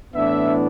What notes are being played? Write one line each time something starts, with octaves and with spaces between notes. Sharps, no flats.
A2 E3 B3 D4 E5